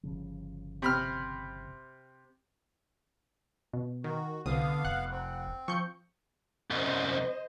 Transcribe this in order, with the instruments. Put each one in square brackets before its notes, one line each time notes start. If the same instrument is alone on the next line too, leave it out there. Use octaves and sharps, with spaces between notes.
[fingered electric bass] G1 C#3 F3
[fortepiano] C3 B5 F6
[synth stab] B2
[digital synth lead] D#3 [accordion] F#4
[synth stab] C2 [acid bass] D3 [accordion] B3 F5 [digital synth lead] D#6
[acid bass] F1 [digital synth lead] F#5 [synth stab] F#6
[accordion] C4
[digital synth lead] F3 [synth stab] C#6 G6 C#7
[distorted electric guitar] C2 F#2 [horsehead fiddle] C5 D#5